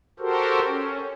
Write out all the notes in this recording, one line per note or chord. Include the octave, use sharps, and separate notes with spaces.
F#4 G4 A4 A#4 C5
C#4